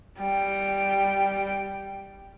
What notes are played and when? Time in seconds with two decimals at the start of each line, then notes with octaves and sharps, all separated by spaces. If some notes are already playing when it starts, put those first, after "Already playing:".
0.19 G3 G5